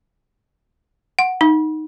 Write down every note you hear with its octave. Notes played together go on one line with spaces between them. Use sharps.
F#5
D#4